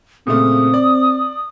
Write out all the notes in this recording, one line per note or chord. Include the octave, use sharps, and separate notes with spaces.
A#2 C#3 A3 C4 D#6
D5